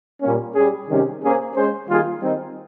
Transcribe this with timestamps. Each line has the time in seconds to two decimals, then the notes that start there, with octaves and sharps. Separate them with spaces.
0.22 A#2 G3 A#3 C#4
0.55 G3 C#4 G#4
0.88 C3 D#3 G3 C#4 G4
1.22 A#3 C#4 G#4 C5
1.55 G#3 C#4 G#4 C5
1.88 D#3 G3 A#3 F4 G#4
2.21 D#3 G3 C4 D#4